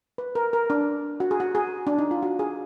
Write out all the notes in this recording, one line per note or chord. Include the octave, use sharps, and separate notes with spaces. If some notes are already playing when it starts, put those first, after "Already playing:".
B4
A#4
A#4
D4
F#4
G#4
F#4
G#4
D4
D#4
F4
F#4
G#4